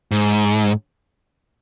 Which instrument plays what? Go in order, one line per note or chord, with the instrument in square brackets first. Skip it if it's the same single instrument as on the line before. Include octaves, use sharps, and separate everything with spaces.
[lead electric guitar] G#2